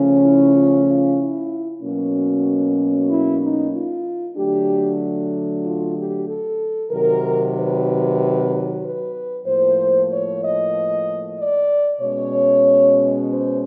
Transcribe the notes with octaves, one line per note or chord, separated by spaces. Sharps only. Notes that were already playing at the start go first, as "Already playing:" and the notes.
Already playing: C#3 F3 A3 C#4
E4
F4
F4
E4
B2 F#3 A#3 C#4
E4
D#4
F4
D3 F#3 A3 D4 G4
F4
G4
A4
C3 D#3 F#3 A#4
B4
B4
A2 F3 A#3 C5
C#5
D#5
D5
B2 G#3 C#4 C#5
C5